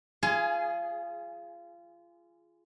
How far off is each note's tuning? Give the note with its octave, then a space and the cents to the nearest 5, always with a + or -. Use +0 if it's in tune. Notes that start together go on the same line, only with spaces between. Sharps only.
F4 -25 G#4 +0 G#5 +20